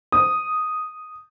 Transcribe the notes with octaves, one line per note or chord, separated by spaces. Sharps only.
D#6